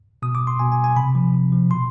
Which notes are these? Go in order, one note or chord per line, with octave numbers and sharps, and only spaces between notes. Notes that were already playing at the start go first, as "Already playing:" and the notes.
B2 D#6
D6
C6
B2 G#5
G#5
G#5
C3 B5
F3
C3
F3
B2 C6